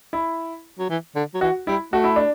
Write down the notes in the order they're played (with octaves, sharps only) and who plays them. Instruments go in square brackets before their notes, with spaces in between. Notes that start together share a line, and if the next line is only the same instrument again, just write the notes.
[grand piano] E4
[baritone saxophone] F#3
E3
D3
F#3
[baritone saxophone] E3 [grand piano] F#4
[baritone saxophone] G3 [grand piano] E4
[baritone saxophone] A3 [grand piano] F#4
[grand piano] E4
D4